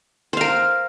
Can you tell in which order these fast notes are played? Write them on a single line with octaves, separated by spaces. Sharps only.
C5 F5 A#4